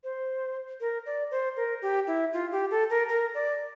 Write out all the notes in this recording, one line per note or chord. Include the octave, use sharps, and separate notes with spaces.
C5
A#4
D5
C5
A#4
G4
E4
F4
G4
A4
A#4
A#4
D5